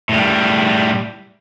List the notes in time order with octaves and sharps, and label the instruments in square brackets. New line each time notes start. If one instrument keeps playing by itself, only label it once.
[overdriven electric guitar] A2 G3